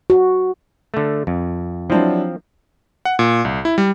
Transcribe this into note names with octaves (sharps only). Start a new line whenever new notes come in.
F#4
D3 A3
F2
F3 F#3 C4 D4 E4
F#5
A#2
C2
E4
G3